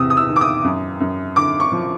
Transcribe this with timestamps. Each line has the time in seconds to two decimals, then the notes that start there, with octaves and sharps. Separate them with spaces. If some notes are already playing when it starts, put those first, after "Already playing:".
Already playing: E2 C3 D#6 E6
0.10 D#6
0.17 E6
0.29 D#3
0.36 D6
0.41 D#6
0.64 F#2
1.00 F#2
1.36 D3 D6
1.60 C#6
1.72 F3